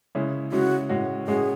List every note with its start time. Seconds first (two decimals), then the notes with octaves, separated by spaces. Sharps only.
0.15 C#3 G#3 C#4 E4
0.52 C#3 G#3 C#4 E4 F#4
0.89 A2 G#3 C#4 F#4
1.27 A2 G#3 C#4 F#4 G#4